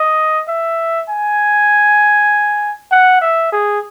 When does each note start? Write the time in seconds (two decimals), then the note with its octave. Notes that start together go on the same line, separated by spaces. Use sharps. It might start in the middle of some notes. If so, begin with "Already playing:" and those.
Already playing: D#5
0.48 E5
1.09 G#5
2.92 F#5
3.22 E5
3.53 G#4